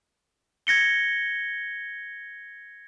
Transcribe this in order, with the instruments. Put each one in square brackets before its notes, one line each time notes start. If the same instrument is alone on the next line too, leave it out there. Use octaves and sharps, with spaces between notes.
[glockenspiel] G#6 A#6 C#7 G7